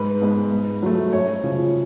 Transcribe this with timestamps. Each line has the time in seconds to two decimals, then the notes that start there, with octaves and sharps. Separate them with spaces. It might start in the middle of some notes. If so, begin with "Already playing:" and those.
Already playing: G#2 B4
0.22 G#3 B3
0.51 G#2
0.82 F#3 A3
1.12 F#2 C#5
1.44 C#3 F3